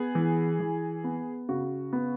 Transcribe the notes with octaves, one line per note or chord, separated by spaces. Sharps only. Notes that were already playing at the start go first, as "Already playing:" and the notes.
Already playing: B3 G#4
E3
E3
B3
C#3 F#4
B3